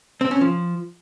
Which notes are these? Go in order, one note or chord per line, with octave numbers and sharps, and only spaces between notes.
C4
C#4
F3